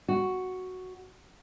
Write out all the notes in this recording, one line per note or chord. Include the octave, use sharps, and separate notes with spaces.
F#4